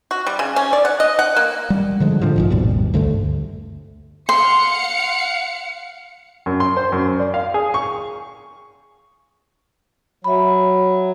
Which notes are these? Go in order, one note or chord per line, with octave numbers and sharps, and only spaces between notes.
F#4
G3
C#3
C#4
D5
F#5
D#5
F#5
A#3
G3
D3 F3 G#3
A2 D3 F3
A#1 G#2 F3
G#1 D#2 B2 G3
D2 G2 D3 A3
F5 F#5 C6 C#7
F#2
C6
C5
F#2
D5
F5
G#4
C#6
F#3 E5 B5